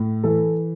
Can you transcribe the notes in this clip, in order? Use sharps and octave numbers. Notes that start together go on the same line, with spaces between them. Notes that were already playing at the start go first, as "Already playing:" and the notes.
Already playing: A2
E3 A4